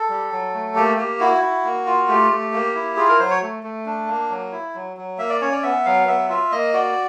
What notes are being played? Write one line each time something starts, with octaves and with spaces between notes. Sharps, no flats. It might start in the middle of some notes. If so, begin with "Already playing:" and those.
Already playing: A4
G3
F#3
A3
A#3 G4
A#3 G4
E4 F#4
E4
A#3
F4
A3 G4
A3
A#3
E4
F4 G#4
A#4
F#3 C5
C#5
A3
A3
D4
A#3
F#3
E4
F#3
F#3
A#3 E5
D5
C#4 C#5
D5
B3 E5
F#3 F5
B3 E5
F4 E5
A#3 D#5
F#4 D5